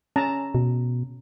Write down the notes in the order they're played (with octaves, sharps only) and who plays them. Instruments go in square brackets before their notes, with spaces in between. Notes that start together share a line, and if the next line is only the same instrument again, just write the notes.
[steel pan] C#4 A5 A#5
[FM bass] B2